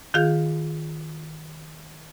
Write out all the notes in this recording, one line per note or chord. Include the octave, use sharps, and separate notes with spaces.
D#3 F4 G#4 F5 G6